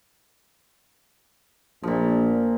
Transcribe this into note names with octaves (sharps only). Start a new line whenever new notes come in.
A#1 A#2 F3